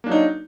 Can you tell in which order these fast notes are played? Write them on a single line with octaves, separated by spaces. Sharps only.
A#3 D4 F#3 D#4